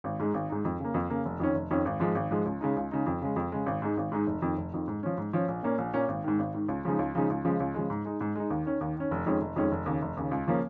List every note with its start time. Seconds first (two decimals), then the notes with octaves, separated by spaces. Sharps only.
0.04 G#1
0.19 G#2 G#3 D#4
0.34 G#1
0.49 G#2 G#3 D#4
0.65 F2
0.80 C#3 A#3
0.94 F2
1.10 C#3 A#3
1.25 F1
1.40 F2 D#3 C#4
1.55 F1
1.70 F2 D#3 C#4
1.85 G#1
2.00 G#2 F3 G#3
2.15 G#1
2.31 G#2 F3 G#3
2.45 C#2
2.60 C#3 G#3 D#4
2.77 C#2
2.91 C#3 G#3 D#4
3.06 F2
3.21 C#3 G#3
3.36 F2
3.52 C#3 G#3
3.66 G#1
3.82 G#2 G#3 D#4
3.97 G#1
4.12 G#2 G#3 D#4
4.27 F1
4.42 F2 D#3
4.58 F1
4.72 F2 D#3
4.88 G#2
5.03 F3 C#4
5.18 G#2
5.33 F3 C#4
5.48 A#1
5.63 A#2 A#3 C#4
5.78 A#1
5.94 A#2 A#3 C#4
6.08 G#1
6.24 G#2 D#3
6.39 G#1
6.54 G#2 D#3
6.69 C#2
6.85 C#3 F3 G#3 D#4
6.99 C#2
7.15 C#3 F3 G#3 D#4
7.30 C#2
7.45 C#3 F3 G#3
7.60 C#2
7.74 C#3 F3 G#3
7.90 G#2
8.05 G#3 D#4
8.21 G#2
8.35 G#3 D#4
8.50 D#2
8.66 D#3 C#4
8.81 D#2
8.96 D#3 C#4
9.11 F1
9.26 F2 D#3 G#3 C#4
9.41 F1
9.56 F2 D#3 G#3 C#4
9.72 F1
9.86 D#2 C#3
10.02 F1
10.17 D#2 C#3
10.31 C#2
10.47 C#3 F3 A#3 C#4